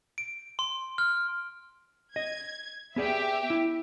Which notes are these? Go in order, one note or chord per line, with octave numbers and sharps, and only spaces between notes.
D7
C6
F6
D#5 G#6
B3 G4 G#4 D5 E5
E4